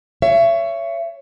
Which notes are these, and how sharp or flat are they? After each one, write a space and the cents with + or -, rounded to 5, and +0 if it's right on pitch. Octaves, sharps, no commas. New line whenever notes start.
C#5 +5 E5 +30